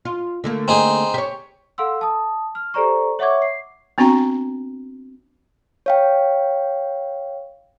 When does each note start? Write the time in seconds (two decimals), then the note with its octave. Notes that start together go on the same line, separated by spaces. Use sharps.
0.05 F4
0.44 D3 A3 A#3
0.68 C4 D#4 G#4
1.14 G4 C#5
1.78 A4 F5 F#5 C6 E6
2.01 A5 D#6
2.55 F6
2.74 G4 A4 C5 D5 A#5 C#6
3.19 C#5 E5 F#5 C#6 D6 G#6
3.42 C7
3.98 B3 C4 D4 F#4 G5 A#5
5.86 C#5 F5 G5